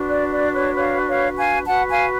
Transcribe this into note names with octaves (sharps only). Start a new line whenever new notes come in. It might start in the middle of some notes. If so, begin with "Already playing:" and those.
Already playing: D4 F#4 B4
D5
D5
C#5
C#5 F5
C#5 F5
F5 G#5
F#4 B4 F#5 A5
F5 G#5